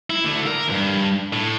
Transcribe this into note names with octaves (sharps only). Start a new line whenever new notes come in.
E4
D3 A3
A#4
D2 G2
A2